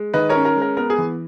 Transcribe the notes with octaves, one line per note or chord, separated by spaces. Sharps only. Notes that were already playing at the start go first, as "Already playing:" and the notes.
Already playing: G#3
D#3 B4 D#5
A#4 C#5
C#4
A#4
G#3
A#4
B3 A#4
G#4
E3